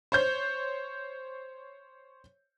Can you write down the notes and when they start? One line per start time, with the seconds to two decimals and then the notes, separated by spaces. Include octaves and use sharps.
0.12 C5 C#5 G6